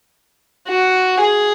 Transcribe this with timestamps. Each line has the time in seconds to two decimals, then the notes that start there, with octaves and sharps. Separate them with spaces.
0.68 F#4
1.20 G#4